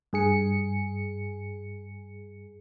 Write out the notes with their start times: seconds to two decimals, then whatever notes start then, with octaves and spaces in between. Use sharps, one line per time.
0.13 G2 G#4 C#7